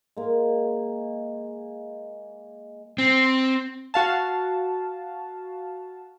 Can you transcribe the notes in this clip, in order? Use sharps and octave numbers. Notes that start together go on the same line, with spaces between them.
G#3 A#3
C4
F#4 F5 A5